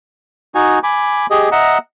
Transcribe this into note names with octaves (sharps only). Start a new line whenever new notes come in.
D#4 F#4 G#5
G#5 B5 D6
G4 G#4 D#5
D#5 E5 F#5 A#5